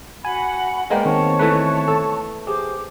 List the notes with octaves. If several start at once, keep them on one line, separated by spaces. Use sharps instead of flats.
F#4 F#5 G#5 B5
G#3 A#3 B3 F4 C5 D5 F5 G5
D#3 C4 C#5 A5 C#6
E3 A3 B4
A4
G4 G#4 C5 D6